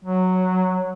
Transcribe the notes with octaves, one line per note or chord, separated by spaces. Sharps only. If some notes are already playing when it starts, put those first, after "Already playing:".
F#3